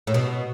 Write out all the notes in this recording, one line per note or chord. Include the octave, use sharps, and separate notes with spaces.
A2
B2